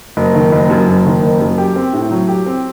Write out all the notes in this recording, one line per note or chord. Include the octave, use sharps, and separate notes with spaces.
F#1
D#3
F#1
F#2
F#1
D#3
F#1
F#2
G4
C4
A2
F#3
G4
C4